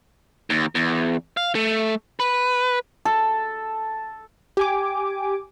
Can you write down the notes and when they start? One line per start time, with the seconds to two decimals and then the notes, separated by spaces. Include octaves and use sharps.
0.50 D#2
0.75 E2
1.37 F5
1.55 A3
2.20 B4
3.05 A4
4.57 G4 G#5 D6